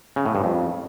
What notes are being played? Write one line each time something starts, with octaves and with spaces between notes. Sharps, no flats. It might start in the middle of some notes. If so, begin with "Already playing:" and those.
C#3
A2
G2
F2